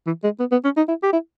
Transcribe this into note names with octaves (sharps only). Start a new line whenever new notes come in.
E3
G#3
B3
B3
C#4
D#4
E4
G4
E4